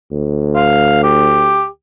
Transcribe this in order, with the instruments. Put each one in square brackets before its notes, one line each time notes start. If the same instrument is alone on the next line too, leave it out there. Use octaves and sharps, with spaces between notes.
[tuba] D2
[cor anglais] F5
G4